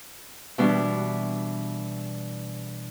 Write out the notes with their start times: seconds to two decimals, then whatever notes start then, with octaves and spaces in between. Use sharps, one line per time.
0.58 B2 E3 G3 D4